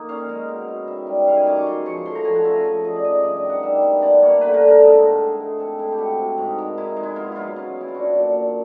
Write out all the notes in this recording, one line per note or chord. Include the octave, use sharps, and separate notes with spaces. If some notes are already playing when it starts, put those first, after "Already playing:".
Already playing: A#3 D#4
C#4 F5
G#3
B2
E4
D#3 E5
G3
E5
D#3 F5
G#5
F#2 D6
C#6
C#3 C6
F3 C#6
A3 C6
A#5
F3 G#5
F#5
C#3 E5
F3
F3 D#5
D5
C#3 D#5
G2 D5
D#5
D#3
F#5
G3 E5
B3
D4 D5
A#3 C#5
D3 B4
A#4
D3
A#4
G#3 A4
A2
A2
G#3
C3 A4
C3 E4
G4
C3 F#4
C3
G#2
D#3
G#3 E4
G#3
E4
B3 F4
F#3 E4 F4
C#3
B3
E4
F4
D4 F#4
A#2
A#2